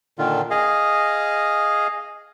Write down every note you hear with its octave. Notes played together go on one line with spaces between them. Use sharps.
A#2 D3 D#3 F4
G#4 D#5 F5